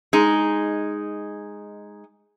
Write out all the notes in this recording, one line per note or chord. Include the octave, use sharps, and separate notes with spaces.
G#3 D#4